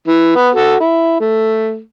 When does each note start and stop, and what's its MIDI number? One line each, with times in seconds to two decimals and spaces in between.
0.08 0.32 52
0.35 0.49 59
0.55 0.76 66
0.55 0.76 69
0.80 1.18 64
1.20 1.80 57